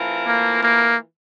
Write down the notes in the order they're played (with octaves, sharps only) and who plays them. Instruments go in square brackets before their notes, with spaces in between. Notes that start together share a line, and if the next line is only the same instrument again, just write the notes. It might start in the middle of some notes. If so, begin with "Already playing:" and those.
Already playing: [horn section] E3 A3 C4 F4 A#4
[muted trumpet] A#3
A#3